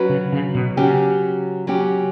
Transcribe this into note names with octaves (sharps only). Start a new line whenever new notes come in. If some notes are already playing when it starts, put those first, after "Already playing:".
Already playing: F#3 C#4 F#4 B4
C#3
C#3
B2
C#3 F#3 C#4 G4
F#3 C#4 G4